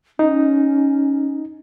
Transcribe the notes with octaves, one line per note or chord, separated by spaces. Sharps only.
C#4 D#4